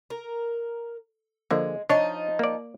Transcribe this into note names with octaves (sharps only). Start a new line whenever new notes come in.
A#4
D3 F3 G#3 A#3
F3 D4 D#4 C#5
A#3 D5